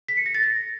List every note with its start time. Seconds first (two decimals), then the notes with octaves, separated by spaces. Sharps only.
0.08 B6
0.17 C#7
0.26 A#6
0.35 A6
0.43 A#6